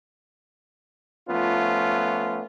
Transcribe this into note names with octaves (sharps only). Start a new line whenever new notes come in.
F3 A3 B3 C#4 F4